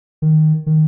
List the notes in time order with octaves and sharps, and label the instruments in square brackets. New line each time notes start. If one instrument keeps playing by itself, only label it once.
[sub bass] D#3
D#3